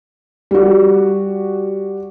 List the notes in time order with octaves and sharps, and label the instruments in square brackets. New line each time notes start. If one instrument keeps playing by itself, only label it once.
[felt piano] G3 F#4